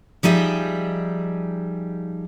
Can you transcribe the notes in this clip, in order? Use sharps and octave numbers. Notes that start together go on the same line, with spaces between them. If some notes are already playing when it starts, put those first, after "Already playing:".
F3 G3 D#4 G#4 E5